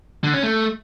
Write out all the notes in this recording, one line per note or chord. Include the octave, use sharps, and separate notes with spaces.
D3
C#4
A3